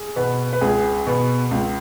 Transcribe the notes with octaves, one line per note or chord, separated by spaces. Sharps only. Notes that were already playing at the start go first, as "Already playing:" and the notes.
Already playing: G#4
B2 B3 B4
B4
C#2 G#4
B2 B3
C#2